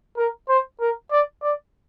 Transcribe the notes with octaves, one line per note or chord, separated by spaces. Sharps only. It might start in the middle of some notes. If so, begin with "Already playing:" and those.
A#4
C5
A#4
D5
D5